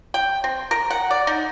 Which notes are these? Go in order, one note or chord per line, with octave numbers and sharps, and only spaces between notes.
G5
C4
A#4
F#5
D5
D#4